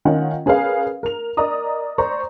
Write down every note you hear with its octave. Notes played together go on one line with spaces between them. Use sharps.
D#3 C#4 F4 F#5
C#4 G#4 A#4 B4 F5
A#4 F7
A#4 D5 D#5 A#5 D#6
C5 D5 A#5 C#6